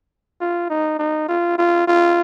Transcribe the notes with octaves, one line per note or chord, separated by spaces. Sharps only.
F4
D#4
D#4
F4
F4
F4